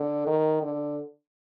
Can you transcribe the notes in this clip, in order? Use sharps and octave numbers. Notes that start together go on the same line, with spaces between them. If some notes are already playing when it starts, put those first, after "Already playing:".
Already playing: D3
D#3
D3